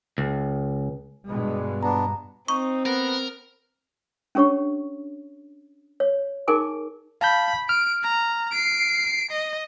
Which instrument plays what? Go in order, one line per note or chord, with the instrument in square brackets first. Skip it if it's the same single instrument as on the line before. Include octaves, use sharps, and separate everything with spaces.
[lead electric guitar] C#2
[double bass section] G2 B2 G#3
[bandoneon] B3 D4 [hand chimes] A#5
[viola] C4 [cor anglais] D#4 [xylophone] C#6
[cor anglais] B3 [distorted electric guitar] A#4
[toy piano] C#4 D4 G4 C#5 C#6
C#5
D#4 G#4 A#4 G#5 D6
[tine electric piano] F5 A5 G6 [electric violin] B5
[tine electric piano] F6 [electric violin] D7
[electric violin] A#5
C7 D7
D#5